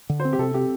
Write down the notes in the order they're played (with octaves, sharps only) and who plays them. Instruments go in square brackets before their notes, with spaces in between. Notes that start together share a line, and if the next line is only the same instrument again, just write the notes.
[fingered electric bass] D3
[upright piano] C5
[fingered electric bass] C4
[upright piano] G4
[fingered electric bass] C3 [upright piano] A4
[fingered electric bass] C4 [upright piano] G4